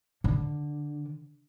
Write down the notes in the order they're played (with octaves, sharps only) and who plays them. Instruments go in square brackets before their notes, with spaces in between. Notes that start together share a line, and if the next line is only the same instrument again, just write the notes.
[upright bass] D3